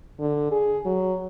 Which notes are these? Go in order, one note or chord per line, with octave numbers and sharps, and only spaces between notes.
D3
G#4
F#3